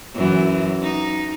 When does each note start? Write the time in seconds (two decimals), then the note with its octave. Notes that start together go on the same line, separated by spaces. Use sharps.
0.14 F#2 E3
0.82 D#4